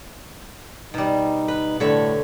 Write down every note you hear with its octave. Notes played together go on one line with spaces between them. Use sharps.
B2 G3 D#4
B4
A2 D3 C#5 E5